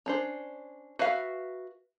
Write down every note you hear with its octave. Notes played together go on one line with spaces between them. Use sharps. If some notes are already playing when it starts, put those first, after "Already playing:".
C#4 D4 C5
F#4 B4 E5 F5